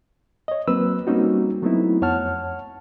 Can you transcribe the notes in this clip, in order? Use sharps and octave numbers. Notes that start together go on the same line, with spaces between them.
C#5 D#5
F#3 A#3 C4 B4 E6
G3 A#3 C4 C#4 D#4 F#4
F#3 A3 B3 C4 D#4 E4
F2 C#5 F#5 A5 F6